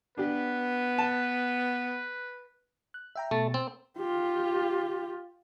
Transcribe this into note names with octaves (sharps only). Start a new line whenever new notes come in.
B3 D4 G4 B4
A5
F#6
E5 G5 A#5
B2 A3 A6
C4
F4 G4